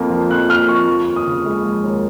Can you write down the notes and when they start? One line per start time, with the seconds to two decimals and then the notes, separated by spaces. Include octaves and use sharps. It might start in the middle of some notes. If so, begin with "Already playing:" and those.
Already playing: F2 A#3
0.10 F3
0.30 F2 F#6
0.49 A#3 F6
0.69 F2 C#6
0.88 F3 C#6
1.06 D#2
1.16 D#6
1.27 C#3
1.46 G#3
1.64 F3
1.84 D#2